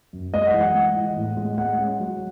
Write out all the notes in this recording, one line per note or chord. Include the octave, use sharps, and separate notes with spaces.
F#2
G#3 D#5
F#5
E3
F#5
G#3
E3
A2
G#3
G#3 F#5
C#4
F#3